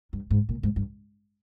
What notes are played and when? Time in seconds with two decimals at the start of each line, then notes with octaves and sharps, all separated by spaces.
0.13 G2
0.31 G#2
0.49 A#2
0.63 G#2
0.76 G2